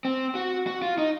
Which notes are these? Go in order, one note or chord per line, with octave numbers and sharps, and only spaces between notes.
C4
F#4
F#4
F4
D#4